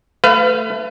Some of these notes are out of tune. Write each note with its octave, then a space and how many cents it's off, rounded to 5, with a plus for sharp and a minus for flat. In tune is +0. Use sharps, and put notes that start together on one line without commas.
A3 +10 B4 +25 F5 -20